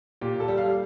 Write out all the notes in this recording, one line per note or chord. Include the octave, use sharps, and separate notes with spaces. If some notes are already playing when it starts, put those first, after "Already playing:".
A#2 G4
A4
G3
F5